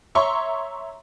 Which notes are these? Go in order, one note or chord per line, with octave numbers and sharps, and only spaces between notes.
C#5 E5 A#5 C6 C#6